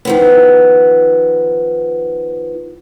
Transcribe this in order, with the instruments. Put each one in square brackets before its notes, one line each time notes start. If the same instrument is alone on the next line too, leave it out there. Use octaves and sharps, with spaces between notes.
[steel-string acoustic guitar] D#3 F3 B3